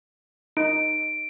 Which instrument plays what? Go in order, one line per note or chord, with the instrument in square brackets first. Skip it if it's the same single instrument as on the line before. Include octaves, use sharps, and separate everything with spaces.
[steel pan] D#4 [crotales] D7